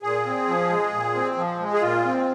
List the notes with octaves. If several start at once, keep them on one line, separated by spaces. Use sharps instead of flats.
A#2 G#4
C4
F3
G#3
A#2
C4
F3
G#3
G#4
A#2 F4
C4